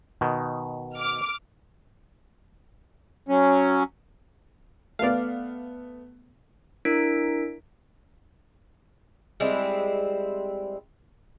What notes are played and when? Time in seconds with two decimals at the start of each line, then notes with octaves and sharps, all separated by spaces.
0.21 B2 D#3
0.95 D6 F6
3.29 F#3 C#4
4.99 A3 B3 D5 F5
6.85 D4 E4 A#4 B6 D7
9.40 G3 G#3 C4 E4